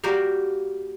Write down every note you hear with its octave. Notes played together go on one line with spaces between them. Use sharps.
G3 A#3 F#4 G4 A#4 F5